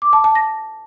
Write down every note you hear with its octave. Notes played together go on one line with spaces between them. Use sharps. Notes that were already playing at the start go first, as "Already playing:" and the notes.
D6
A5
A5
A#6